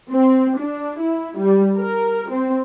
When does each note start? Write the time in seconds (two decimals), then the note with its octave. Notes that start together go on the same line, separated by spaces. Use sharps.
0.11 C4
0.59 D4
1.00 E4
1.38 G3
1.78 A#4
2.31 C4